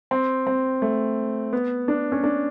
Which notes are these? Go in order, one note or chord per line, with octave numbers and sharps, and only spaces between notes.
C4
C4
A3
B3
D4
C#4
D4